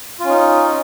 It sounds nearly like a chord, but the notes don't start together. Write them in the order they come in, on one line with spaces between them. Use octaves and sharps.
F4 C#4 D#4